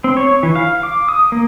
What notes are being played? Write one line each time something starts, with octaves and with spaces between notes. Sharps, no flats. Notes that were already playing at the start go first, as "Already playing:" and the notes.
C4
C#5
E3
F5
D6
D#6
A#3